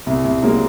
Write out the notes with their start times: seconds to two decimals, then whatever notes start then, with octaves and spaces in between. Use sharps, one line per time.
0.06 C2
0.24 C2
0.43 F#3 G#3 A#3